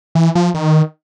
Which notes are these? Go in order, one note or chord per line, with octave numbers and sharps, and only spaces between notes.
E3
F3
D#3